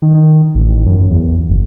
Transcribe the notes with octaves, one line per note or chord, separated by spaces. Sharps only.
D#3
D#3
A1
F#2
E2
F#1